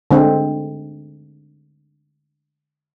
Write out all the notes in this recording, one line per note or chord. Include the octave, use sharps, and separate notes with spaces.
D3 G#3 C4